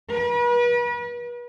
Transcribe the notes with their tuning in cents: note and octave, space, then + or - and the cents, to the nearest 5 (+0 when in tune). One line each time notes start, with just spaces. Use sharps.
B4 -40